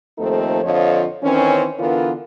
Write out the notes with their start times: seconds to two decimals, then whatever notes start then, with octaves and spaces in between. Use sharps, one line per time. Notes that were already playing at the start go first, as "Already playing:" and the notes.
0.18 D#2 F3 A3 C4 D#4 A4
0.63 F2 D3 F3 F4 C#5 D#5
1.23 D#3 E3 C4 C#4
1.79 D3 E3 B3 D4 F4 A#4